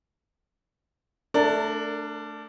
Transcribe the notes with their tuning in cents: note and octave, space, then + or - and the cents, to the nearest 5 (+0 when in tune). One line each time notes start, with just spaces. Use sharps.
A3 +0 D4 +0 A#4 -35